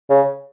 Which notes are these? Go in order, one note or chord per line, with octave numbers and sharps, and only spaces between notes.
C#3